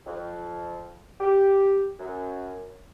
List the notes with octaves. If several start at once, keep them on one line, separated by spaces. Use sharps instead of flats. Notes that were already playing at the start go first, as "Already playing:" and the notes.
F2
G4
F#2